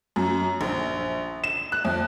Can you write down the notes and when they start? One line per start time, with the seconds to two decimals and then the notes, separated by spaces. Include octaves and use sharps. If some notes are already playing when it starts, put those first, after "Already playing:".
0.16 F#2
0.61 A#1
1.44 E7
1.72 F#6
1.85 F2